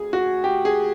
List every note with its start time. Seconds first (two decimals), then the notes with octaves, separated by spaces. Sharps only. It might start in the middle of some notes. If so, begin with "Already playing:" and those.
Already playing: D2 G#4
0.13 F#4
0.44 G4
0.65 G#4